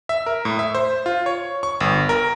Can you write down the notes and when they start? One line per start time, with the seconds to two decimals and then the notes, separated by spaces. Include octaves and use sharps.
0.09 E5
0.26 A#4
0.45 A2
0.59 E5
0.75 C5
1.06 F4
1.26 C#5
1.63 C#6
1.81 G1
2.09 A#4